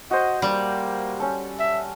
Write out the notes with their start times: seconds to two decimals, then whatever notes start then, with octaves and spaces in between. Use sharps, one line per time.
0.11 F#4 C5 D#5
0.42 G3 A#3
1.20 C#4 A4
1.59 E5